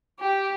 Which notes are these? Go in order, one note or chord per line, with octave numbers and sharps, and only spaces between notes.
G4